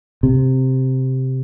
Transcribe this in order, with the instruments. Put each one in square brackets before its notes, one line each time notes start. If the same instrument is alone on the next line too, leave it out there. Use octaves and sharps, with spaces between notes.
[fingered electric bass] C3